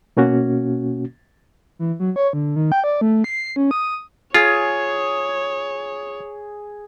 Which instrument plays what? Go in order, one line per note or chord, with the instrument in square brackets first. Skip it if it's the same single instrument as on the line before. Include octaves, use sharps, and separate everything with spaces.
[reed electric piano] B2 A#3 C#4 F#4
[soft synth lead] E3
F#3
C#5
D3
D#3
G5
D5
A3
C7
C#4
D#6
[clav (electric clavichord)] F4 [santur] G#4 [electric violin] C#5